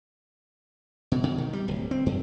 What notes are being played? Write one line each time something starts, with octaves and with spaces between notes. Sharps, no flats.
B2
B2
D#3
G3
D1
C4
F#2